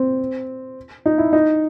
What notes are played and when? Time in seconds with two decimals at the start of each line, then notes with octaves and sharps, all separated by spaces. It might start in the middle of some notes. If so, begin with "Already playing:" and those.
Already playing: C4
1.06 D#4
1.18 E4
1.33 D#4